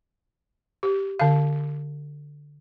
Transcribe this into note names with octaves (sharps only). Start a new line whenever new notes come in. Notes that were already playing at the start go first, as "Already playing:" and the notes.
G4
D3 F5